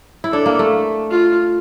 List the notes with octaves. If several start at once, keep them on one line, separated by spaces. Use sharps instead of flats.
E4
D4 A4
A#3
A3
F4